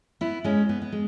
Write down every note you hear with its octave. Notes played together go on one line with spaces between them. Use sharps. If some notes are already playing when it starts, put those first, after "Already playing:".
B3 E4
G#3 C#4
B3
B3
G#3